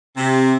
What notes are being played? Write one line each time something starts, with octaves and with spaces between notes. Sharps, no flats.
C3